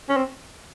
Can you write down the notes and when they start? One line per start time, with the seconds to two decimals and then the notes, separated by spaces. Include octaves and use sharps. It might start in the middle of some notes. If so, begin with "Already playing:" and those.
0.09 C#4
0.17 C4